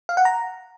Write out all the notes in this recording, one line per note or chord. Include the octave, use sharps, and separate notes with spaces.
F5
F#5
A#5